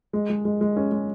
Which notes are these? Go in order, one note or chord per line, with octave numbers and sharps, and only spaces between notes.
G#3
G#3
G#3
G#3
C#4
G#3